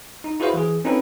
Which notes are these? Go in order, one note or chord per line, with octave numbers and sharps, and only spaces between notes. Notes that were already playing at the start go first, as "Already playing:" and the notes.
D#4
E4 F#4 G#4 B4 C5 F5
E3 G#4
C4 C#4 D#4 F4 A4 B4